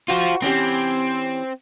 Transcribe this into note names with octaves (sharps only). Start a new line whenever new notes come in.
F4 F#4 C5
E3 C4 C#4 G4